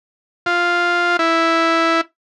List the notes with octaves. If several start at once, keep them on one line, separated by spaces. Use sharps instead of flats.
F4
E4